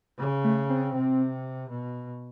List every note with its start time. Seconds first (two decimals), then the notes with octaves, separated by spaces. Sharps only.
0.19 C#3
0.44 A3
0.69 C4
0.94 C3
1.69 B2